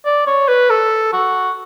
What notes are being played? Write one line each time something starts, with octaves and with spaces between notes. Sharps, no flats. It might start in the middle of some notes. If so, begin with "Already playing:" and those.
D5
C#5
B4
A4
F#4